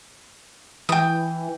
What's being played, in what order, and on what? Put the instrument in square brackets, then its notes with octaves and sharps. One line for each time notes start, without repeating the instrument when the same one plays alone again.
[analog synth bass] E3 [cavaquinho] G5 D#6